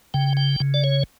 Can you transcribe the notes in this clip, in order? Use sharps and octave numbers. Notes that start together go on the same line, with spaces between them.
C#3 G5
G5
C#3
D5
C#5